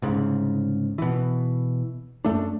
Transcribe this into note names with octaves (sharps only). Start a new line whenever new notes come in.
C2 G#2 C#3
B2 E3
F#2 A3 D4